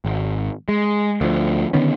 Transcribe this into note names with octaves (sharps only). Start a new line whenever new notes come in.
G#1
G#3
D2 F3
D3 D#3 B3 C#4